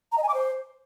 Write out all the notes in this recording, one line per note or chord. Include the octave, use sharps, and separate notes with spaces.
A#5
D#5
G#5
D6
C5